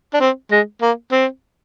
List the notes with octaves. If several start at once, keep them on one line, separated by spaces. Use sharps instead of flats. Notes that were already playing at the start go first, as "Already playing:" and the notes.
D4
C4
G#3
A#3
C4